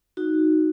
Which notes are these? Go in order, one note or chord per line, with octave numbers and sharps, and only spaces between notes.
D#4 F#4